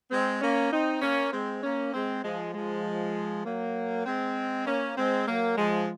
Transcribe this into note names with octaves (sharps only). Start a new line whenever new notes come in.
G#3 C4
A#3 C#4
C4 D#4
A#3 C#4
G#3 C4
A#3 C#4
G#3 C4
F3 G#3
F3 G#3
F#3 A#3
G#3 C4
A#3 C#4
G#3 C4
F#3 A#3
F3 G#3